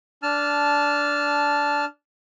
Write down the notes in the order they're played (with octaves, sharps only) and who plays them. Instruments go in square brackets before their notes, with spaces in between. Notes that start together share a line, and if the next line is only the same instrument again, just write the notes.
[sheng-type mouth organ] D4 A5 F6